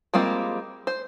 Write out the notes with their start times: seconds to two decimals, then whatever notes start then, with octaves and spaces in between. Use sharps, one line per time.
0.14 G3 G#3 A#3 C4 F4
0.87 C5